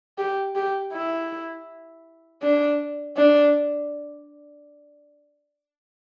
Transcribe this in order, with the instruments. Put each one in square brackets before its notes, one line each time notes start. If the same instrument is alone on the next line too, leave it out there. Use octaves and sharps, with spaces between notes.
[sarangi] G4
G4
E4
D4
D4